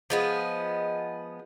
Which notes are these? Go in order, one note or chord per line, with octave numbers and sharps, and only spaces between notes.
F3 G#3 B3